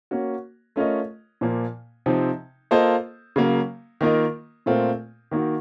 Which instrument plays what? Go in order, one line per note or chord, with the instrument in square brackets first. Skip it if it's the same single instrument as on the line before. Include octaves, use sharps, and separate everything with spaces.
[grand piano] A#3 C#4 F#4
A3 C#4 F4 A#4 D#5
A#2 F3 A#3
C3 F3 C4 D#4
A#3 F4 A4 C5 D#5
C#3 F#3 A#3
D#3 A#3 F4 A#4 D#5
A#2 A3 C4 F4 A#4
D#3 A#3 D#4 F#4